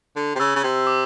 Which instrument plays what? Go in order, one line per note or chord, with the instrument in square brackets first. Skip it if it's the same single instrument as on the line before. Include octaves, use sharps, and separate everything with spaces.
[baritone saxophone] D3
C3
[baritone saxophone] C#3 [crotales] E6
[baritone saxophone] C#3
C3
[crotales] D6